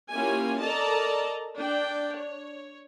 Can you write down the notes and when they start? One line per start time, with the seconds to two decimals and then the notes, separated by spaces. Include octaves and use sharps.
0.10 A#3 C#4 E4 F4 G4 G#5
0.61 A4 A#4 D5 D#5 A5 A#5
1.59 D4 G5
2.16 C#5